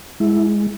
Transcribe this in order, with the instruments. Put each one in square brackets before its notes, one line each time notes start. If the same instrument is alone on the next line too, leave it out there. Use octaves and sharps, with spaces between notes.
[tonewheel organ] G#3 E4